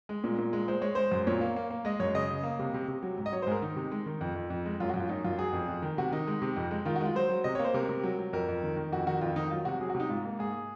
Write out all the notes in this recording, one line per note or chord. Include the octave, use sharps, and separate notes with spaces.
G#3
A#2
A#2
G#3
G#3 C5
G#3 C#5
G#3 C5
F#2
A#2 C#5
A#3
A#3
A#3
G#3 D#5
F#2 C#5
C#3 D#5
C#3
A#3
C3
C3
C3
F#3
G#2
D#5
F#3 C#5
C5
G#2 G#4 A#4
D#3 D#4
C3
G#3
D#3
F2
F2
F2
G#3
F#2 F4
F#4
F#2
F4
F#2 D#4
F#2 F4
F#3 G#4
F2
F2
D#3
C3 F#4
D#3 D#4
G#3
C3
F2
G#3
D#3 F4
F#4
G#3 F4
F#3 C5
F#3
C3 D#5
C#5
A#3
C5
C3 A#4
C3
F#3
F#3
F2 A#4
F2
D#3
D#3
F2 F#4
D#3 F#4
F2 F4
D#3 D#4
F#3 F4
C3 F#4
F#3 G#4
F#4
C3
D#4
G#2 F4
A#3
G#2 G#4